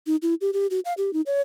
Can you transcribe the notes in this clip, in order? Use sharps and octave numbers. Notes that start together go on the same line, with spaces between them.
D#4
E4
G4
G4
F#4
F5
G4
D#4
C#5